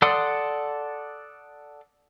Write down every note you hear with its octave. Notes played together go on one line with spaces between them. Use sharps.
A4 D5 F#5 C6 D#6